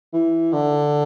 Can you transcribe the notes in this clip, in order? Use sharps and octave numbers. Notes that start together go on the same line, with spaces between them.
E3
D3